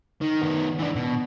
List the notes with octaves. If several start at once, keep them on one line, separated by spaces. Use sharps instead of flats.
D#3
D#3 B3
E3 D4
B2